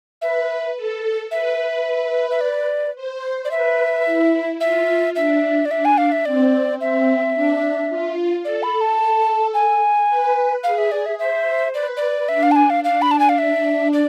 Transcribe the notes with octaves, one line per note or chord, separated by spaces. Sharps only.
B4 E5
A4
B4 E5
E5
D5
C5
D5
B4 E5
E4
F4 E5
D4 E5
D5
D4 E5
G#5
F5
E5
C4 D5
C4 E5
D4
F4
A4 D5
B5
A5
G#5
B4
G#4 F5
E5
D5
E5
C5 E5
B4 D5
D5
D4 E5
F5
A5
G#5
F5
D4 F5
B5
A5
G#5
F5
E5
D5